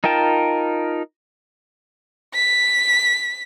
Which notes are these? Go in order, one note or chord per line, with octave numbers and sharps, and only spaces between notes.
D#4 F4 A#4 G5 A5
B6